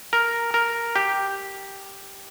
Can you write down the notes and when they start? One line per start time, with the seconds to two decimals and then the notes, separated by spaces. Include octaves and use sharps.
0.13 A#4
0.54 A#4
0.96 G4